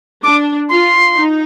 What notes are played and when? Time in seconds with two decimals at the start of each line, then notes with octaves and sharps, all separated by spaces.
0.23 D4 D6
0.69 F4 C6
1.15 D#4